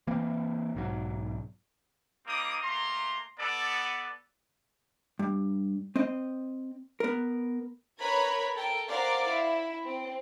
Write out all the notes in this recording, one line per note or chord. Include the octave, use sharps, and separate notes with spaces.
E3 A#3 C4
B1 G#2 F#3
G3 A#3 C4 D#4 D6 D#6
A3 A#3 A#5 C6
B3 A4 D5
G2
C4 D#5
B3 A#4
A#4 B4 C#5 A#5 B5 G#6
A4 A#4 G5
A#4 C5 D5 F5 F#5
E4
C4